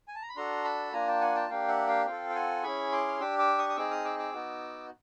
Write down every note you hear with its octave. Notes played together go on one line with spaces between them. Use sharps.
G#5
A5
A#5
B5
D4 F#4 A4 A#5 C6
A5 B5
A#3 D4 F4 G#5 A#5
G5 A5
F#5 G#5
G5 A5
A#3 D4 G4 F5 G5
E5 F#5
F5 G5
C4 F4 A4 F5 G5
G5
F#5 G#5
C#4 E4 G#4 B5 C#6
C6 D6
F6
D4 G4 D6 E6
D6 E6
C#6 D#6
D#6
C4 D#4 G#4 D6 E6
D#6 F6
D6 E6
D6 E6
B3 D#4 F#4